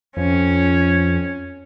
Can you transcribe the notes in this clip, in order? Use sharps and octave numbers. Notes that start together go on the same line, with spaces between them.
F2 C#4